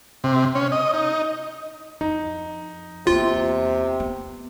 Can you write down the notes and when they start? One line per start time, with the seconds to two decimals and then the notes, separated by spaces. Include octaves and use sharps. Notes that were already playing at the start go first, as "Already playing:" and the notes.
0.24 C3
0.55 C#4
0.72 D#5
0.94 D#4
2.01 F2 D#4
3.07 E2 C3 A#3 F4
4.00 B3